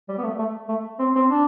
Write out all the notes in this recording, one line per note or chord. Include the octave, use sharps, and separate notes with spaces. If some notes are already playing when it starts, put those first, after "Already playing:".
G3
B3
A3
A3
A3
C4
C4
D4